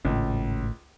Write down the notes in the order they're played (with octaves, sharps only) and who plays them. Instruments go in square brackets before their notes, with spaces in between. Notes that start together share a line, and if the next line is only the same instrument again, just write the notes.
[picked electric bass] G#1 A2 [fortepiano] C#2